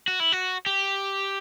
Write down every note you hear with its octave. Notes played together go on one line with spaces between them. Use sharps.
F#4
E4
F#4
G4